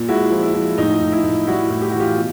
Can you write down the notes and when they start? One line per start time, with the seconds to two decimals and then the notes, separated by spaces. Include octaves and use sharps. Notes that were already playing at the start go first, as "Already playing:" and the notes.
Already playing: A#2
0.08 G#3 E4 F#4
0.31 F3
0.43 E4
0.54 F3
0.78 A2 D#4
1.01 A2
1.12 E4
1.24 A2
1.47 G3 E4 F#4
1.70 A2
1.82 G4
1.91 E3 F#4
2.00 F4 G4
2.17 B2